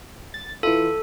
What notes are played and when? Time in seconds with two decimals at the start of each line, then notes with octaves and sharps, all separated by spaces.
0.34 A6
0.63 E3 E4 F4 A4